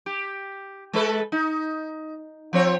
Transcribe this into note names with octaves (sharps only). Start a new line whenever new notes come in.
G4
G#3 A4 B4
D#4
F3 C4 C#5